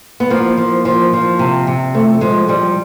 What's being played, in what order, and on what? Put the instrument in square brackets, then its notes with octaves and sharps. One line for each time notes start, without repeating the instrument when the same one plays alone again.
[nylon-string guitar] B3
F3 A#3
F3
F3
F3
C3
C3
F3 A3
F3 G#3
F3 G3